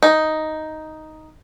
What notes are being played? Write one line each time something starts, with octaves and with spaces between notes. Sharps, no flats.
D#4